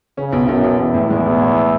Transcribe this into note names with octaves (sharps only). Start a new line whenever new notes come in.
C#3 C#4
B1
B1 F#2
B1
B1 E2
A2
E2 G#3
B1
A2